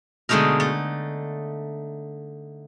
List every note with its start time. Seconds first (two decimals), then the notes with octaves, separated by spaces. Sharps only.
0.29 B2 D3 G#3 A3 D#4 A#4
0.60 A3